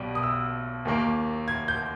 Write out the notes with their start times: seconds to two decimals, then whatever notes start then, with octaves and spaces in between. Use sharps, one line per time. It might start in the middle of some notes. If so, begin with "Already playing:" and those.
Already playing: B1 B2 G3
0.15 D#6
0.23 E6
0.85 D#2 D#3 A#3
1.48 G#6
1.68 G6